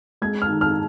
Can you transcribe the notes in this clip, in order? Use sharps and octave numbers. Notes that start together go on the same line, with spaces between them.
G#3 G#6
F6
D#3
F6